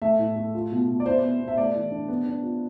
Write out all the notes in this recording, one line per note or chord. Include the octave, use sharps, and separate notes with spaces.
A3 E5
A2
A3
F4
B2
B2
D5
E4 C5
B3
B3
E5
A3 D5
E3
D4
B3
D4
F4